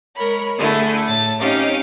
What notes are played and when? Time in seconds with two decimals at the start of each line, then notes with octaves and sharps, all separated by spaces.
0.15 G#3 A#4 C#5 B5
0.57 D3 A3 E4 G#4
1.07 A2 A5 A6
1.39 C4 C#4 D#4 G4 F5